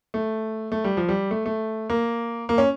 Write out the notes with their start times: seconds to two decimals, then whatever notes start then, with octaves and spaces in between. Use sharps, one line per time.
0.14 A3
0.72 A3
0.84 G3
0.97 F3
1.09 G3
1.31 A3
1.46 A3
1.90 A#3
2.49 A#3
2.58 C#4